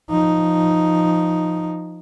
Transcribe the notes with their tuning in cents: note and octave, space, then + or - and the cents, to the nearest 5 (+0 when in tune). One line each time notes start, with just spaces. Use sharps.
F3 +0 D#4 +0